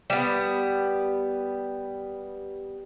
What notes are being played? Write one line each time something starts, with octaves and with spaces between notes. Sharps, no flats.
G3 B3